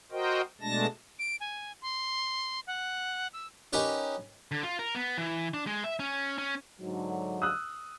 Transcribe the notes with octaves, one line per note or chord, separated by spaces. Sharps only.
F#4 A#4 C5 D#5 G5
B2 G#3 A3 D4 A5 A#6
D7
G#5
C6
F#5
E6
C#4 D#4 G4 A#4 B4 C#5
D3
F4
A#4
B3
E3
D4
G#3
E5
C#4
C#4
G#2 D3 F#3
D#6 E6 F#6